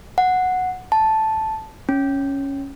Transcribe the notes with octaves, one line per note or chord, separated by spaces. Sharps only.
F#5
A5
C#4